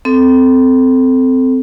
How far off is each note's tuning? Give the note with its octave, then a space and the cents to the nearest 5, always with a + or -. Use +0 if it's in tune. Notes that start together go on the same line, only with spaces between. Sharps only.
C4 -20 A4 +0